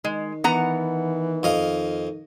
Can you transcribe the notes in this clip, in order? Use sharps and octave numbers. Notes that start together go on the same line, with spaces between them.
D#3 G#3
E3 B3 F#5 A#5
F2 D#5 F5